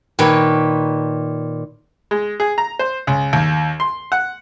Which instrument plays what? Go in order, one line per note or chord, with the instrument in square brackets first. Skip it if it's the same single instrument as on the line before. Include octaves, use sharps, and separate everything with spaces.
[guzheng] A#2 D#3 B4 C#5
[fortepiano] G#3
G#4
A#5
C5
C#2
D#2
C6
F#5